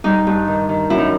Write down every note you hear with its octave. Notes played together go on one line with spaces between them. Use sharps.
G3 D#4
G2
D#3
D#3
F#2 E4
D#4